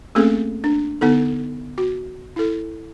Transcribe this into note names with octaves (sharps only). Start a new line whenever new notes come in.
A3 A#3 C4 C#4 G#4 A4
D4
D3 B3 D#4 A4
F#4
E4 A4